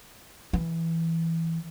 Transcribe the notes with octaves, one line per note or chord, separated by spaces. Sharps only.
E3